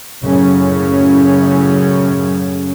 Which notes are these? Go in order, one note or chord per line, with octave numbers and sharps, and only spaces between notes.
F#2 A2 C#3 F#3 C#4